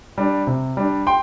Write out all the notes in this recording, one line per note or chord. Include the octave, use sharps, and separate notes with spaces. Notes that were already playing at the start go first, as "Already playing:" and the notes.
G3 D4
C3
G3 D4
G5 C6